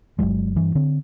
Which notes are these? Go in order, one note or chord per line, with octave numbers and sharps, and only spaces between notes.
G1 C#2 F#3 G#3
G2 E3
D3 C4